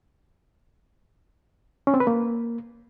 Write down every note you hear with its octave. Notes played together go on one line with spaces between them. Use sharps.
C#4
C4
B4
A#3